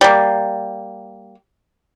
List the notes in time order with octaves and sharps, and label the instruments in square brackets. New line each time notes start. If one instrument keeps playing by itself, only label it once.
[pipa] G3 A#3